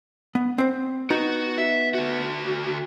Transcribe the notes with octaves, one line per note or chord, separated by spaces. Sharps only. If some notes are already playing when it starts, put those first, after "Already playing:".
B3
C4 C5
B3 D#4 F#4 A#5
E5
D2 F#4